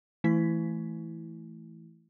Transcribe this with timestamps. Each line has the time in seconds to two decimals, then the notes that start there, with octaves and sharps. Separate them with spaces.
0.24 E3 A3 E4 B6